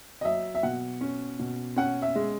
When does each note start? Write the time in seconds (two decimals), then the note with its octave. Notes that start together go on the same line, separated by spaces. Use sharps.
0.21 D#5
0.25 F#3 E5
0.55 E5
0.63 B2 F#5
1.01 C#4
1.39 B2
1.76 C#4 F#5
2.02 E5
2.15 G#3